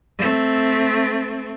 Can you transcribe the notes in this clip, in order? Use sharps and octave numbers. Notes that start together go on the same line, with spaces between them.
A3 C4